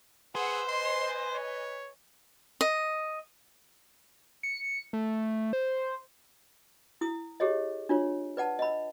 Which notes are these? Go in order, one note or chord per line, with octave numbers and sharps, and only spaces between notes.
G#4 B4 C5 F#5 E6
D#5 G#5 C6
C#5
D#5
C#7
A3
C5
E4 D#6
G4 G#4 C#5 D#5
D4 F4 C#5
B4 D5 F#5 A5
D#5 B5